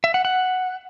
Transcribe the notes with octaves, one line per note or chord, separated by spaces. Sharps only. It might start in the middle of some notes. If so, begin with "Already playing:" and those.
E5
F#5
F#5